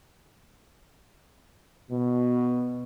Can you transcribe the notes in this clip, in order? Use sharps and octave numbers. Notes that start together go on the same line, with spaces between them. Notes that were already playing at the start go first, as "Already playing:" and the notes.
B2